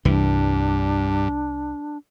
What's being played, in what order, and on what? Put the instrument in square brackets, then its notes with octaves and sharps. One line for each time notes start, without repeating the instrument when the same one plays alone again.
[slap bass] C2 E3 [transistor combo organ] G2 [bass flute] D4